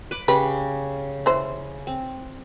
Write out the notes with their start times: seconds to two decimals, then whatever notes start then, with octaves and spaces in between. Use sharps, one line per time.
0.11 B4 D6
0.28 C#3 G4 B4
1.26 E3 C5
1.87 C4